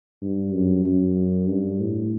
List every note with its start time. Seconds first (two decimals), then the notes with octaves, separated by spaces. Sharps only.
0.22 G2
0.53 F#2
0.86 F#2
1.49 G2
1.80 A2